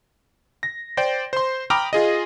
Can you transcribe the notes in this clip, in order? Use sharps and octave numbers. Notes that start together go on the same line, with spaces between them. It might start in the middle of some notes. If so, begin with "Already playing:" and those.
A#6
C5 D5 G5
C5 C6
G5 A#5 B5 D6 D#6 F6
F4 G#4 D#5